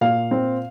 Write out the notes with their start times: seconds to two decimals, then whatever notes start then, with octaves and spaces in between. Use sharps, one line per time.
0.01 A#2 F5
0.31 C4